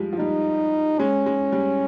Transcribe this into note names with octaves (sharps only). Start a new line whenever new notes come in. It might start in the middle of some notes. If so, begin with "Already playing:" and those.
Already playing: F3 G3 G#3
F3
G3 D#4
G#3 C#4
G#3
G3